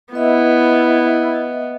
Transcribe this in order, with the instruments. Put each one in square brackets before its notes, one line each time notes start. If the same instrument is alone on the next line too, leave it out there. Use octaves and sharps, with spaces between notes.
[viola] B3 [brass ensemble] E4 [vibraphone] B4 D#5 E5